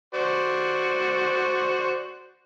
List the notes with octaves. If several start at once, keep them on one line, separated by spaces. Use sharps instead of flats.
F#4 C5 D5